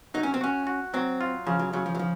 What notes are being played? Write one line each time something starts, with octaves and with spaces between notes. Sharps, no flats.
F#3 D#4
C#4
C4
C#4 F#4
F#4
F#3 C4
F4
C#3 F3
F#3
C#3 F#3
F3
F#3
F3